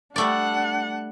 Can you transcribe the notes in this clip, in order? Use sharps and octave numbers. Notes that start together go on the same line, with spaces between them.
G3 A3 D4 D5 F#5